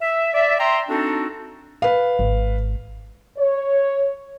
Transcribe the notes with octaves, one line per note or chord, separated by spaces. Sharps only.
E5
D5 E5
E5 G5 A#5 C6
C4 D4 D#4 F#4 A4
B4 F5
G#1
C#5